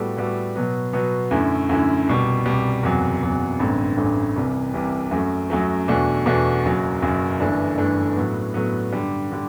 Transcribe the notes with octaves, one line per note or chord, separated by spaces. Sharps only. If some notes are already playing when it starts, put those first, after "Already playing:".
Already playing: A2 G3 B3 F#4 A4
A2 G3 B3 F#4 A4
B2 F#3 B3
B2 F#3 B3
F#2 D3 A3 E4
F#2 D3 A3 E4
C2 B2 G3
C2 B2 G3
F#1 E2 C3 F#3
F#1 E2 C3 F#3
A1 G2 D3 A3 C4
A1 G2 D3 A3 C4
C2 C3 E3 G3
C2 C3 E3 G3
F#2 F#3 A3
F#2 F#3 A3
E2 B2 A3 D4 F#4
E2 B2 A3 D4 F#4
F#1 F#2 F#3
F#1 F#2 F#3
G1 G2 E3 A3 D4
G1 G2 E3 A3 D4
A2 F#3 B3
A2 F#3 B3
G2 D3 G3
D3 G3